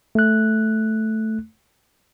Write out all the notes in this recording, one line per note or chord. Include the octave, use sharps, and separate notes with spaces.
A3 F#6